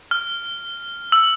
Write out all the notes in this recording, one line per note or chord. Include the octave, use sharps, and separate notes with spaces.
F6
E6